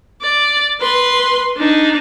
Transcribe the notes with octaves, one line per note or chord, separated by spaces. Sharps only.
D5
B4 C6
D4 D#4